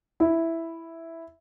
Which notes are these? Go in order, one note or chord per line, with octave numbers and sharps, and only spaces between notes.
E4